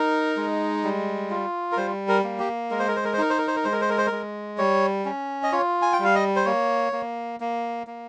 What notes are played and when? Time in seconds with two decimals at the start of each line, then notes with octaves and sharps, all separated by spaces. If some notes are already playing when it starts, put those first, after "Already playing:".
Already playing: D#4 A#4
0.37 G#3
0.84 G3
1.30 F4
1.72 A#4
1.77 G3 C5
2.08 A#4
2.24 A#3
2.39 G4
2.71 G#3 A#4
2.79 C5
2.88 A#4
2.96 C5
3.05 A#4
3.13 C5
3.18 D#4 A#4
3.30 C5
3.38 A#4
3.47 C5
3.56 A#4
3.64 G#3 C5
3.72 A#4
3.81 C5
3.89 A#4
3.98 C5
4.07 A#4
4.12 G#3
4.58 G3 C#5
5.05 C#4
5.43 D#5
5.52 F4 C#5
5.82 G#5
5.93 G5
5.99 G3 F5
6.15 D#5
6.36 C5
6.45 A#3 C#5
6.93 A#3
7.40 A#3
7.87 A#3